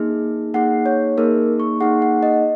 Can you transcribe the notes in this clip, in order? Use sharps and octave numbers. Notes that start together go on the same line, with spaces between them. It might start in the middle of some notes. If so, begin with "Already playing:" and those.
Already playing: A#3 D#4 G#4
A#3 D#4 G#4 F#5
C#5
A#3 D#4 G#4 A#4
C#6
A#3 D#4 G#4 F#5
F#5
D#5